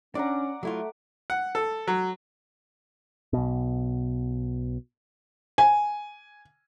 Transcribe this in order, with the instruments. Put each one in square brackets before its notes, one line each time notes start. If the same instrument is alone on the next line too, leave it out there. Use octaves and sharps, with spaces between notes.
[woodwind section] C#4 [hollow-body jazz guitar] D4 [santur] D5 F#5 A#5
[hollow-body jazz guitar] F#3 E4 F4 [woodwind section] A3
[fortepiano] F#5
A4
F#3
[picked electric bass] B1 B2
[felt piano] G#5